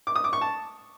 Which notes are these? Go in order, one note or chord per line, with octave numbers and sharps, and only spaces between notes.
D6
D#6
D6
C#6
A5